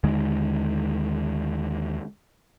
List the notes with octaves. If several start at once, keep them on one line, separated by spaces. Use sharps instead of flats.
D#2 D3 D#3 G#3